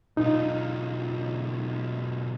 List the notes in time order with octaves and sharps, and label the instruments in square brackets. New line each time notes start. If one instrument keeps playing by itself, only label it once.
[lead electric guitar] B1 F4 [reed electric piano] D#4